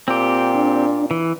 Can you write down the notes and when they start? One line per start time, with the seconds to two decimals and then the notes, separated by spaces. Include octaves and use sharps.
0.08 A#2 C4 G4
0.55 D4
1.11 E3